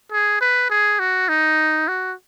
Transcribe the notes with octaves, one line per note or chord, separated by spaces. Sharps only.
G#4
B4
G#4
F#4
D#4
F#4